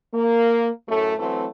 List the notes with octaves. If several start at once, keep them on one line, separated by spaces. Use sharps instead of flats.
A#3
F#2 A2 A3
E3 F#3 A3 C4